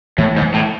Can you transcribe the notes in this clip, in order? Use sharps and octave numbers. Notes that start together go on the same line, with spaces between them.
A2 E3
G#2
E3
A2